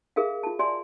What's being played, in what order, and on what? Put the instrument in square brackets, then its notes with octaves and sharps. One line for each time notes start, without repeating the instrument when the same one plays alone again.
[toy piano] G#4 A#4 E5 F5
F4 A5
F#4 D5 E5 G#5 C6